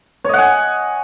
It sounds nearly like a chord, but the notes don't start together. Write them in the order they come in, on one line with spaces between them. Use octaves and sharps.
C#5 D#5 F#5 G#5